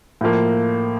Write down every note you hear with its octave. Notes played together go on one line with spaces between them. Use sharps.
A2 F3 A#3